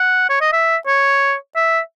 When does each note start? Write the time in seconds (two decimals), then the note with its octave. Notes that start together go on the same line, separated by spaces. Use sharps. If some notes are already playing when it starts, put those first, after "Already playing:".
Already playing: F#5
0.29 C#5
0.41 D#5
0.53 E5
0.86 C#5
1.55 E5